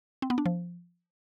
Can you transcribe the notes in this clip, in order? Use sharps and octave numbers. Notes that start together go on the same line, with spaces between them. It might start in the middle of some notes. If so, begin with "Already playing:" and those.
C4
B3
D4
F3